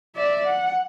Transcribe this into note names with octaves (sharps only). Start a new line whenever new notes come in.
D5 E5
F#5